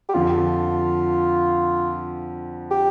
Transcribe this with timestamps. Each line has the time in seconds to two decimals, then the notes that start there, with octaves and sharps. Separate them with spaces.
0.09 G4
0.14 F2 D3 F3 F4
2.71 G4